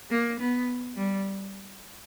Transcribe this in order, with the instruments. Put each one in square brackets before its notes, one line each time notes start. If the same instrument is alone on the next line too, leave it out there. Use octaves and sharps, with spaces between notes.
[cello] A#3
B3
G3